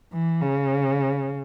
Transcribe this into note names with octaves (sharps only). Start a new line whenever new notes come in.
E3
C#3